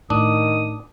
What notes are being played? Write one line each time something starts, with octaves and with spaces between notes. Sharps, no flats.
A2 D#3 D4 D#6